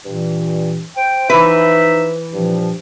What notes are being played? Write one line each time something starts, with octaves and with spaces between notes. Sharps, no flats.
G2 A#2 E3
C5 G5
E3 F3 D#4 B4 E5
G2 A#2 F3